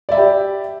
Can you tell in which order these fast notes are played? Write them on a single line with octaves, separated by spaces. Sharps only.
D5 E5 B5 G4